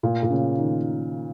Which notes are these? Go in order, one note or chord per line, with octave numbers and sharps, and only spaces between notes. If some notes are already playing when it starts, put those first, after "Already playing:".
A#2
A#2
C#3
D#3